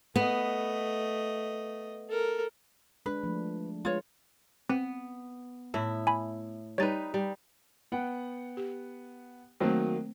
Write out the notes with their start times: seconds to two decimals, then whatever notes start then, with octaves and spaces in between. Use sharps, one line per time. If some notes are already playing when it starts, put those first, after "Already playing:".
0.16 A3 B3 D#5
2.10 A4 A#4
3.06 G#3 D4 B4
3.23 F3 A3 D4
3.85 G#3 F4 B4 C#5
4.69 B3 C4
5.74 A2 E4
6.07 G#5 B5
6.78 G3 D#4 B4 C#5 A6
7.14 G3
7.92 B3 F#5 G5
8.57 G4
9.60 D#3 F#3 A3 A#3 C4 C5